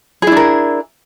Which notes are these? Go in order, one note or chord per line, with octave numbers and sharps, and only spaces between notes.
D4 E4 G#4 A#4